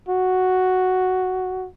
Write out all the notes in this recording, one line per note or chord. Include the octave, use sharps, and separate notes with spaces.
F#4